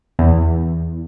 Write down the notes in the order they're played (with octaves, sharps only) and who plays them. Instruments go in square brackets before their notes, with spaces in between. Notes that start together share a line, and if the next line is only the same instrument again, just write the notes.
[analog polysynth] E2